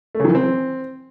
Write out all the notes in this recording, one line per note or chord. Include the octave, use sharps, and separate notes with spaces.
A3
C#3
D#3
E3
C4